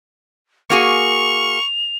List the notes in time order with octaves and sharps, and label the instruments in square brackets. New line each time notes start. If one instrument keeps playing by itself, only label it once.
[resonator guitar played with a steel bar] A#3 F#4 G#4 [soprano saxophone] C#6 [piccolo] F7